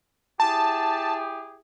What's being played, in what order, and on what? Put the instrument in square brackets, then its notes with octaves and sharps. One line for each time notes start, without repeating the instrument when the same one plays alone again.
[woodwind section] E4 G4 G#4 [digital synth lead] A5